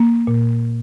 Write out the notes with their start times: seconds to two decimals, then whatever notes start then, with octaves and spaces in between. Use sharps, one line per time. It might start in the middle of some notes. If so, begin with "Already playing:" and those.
Already playing: A#3
0.27 A#2